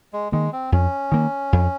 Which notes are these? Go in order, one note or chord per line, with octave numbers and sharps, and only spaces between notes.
G#3
D#3 G#3 A#3
C4
F2 C#4
D#3 A#3
F2